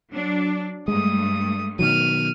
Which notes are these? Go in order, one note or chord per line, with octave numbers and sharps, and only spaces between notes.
F#3 D4
G2 G#3 A3 D#6
B2 D#3 F#3 F6 D#7